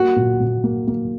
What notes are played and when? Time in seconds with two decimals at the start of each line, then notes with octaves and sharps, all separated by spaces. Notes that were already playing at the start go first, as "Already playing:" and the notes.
Already playing: A#3 F#4
0.16 A#2
0.40 A#2
0.64 A#3
0.87 A#3